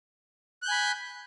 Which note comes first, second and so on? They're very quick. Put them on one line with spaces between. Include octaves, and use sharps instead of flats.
F#6 G6 G#5 B5